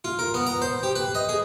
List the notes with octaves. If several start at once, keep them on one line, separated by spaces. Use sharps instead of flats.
F4
A#4
B3
A#5
C5
G4
B4
D#5
G#4